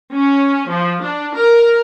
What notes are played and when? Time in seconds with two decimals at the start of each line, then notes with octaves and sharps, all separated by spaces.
0.12 C#4
0.68 F3
1.01 D4
1.35 A#4